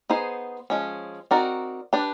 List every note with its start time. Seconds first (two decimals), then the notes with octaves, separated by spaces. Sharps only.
0.10 B3 D#4 G#4 C5
0.70 F3 G#3 C#4
1.31 C4 D#4 F#4 A#4 D5
1.93 D4 G4 B4